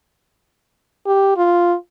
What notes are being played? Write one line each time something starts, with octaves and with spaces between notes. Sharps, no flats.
G4
F4